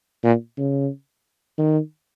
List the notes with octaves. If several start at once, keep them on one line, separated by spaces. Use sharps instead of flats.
A#2
C#3
D#3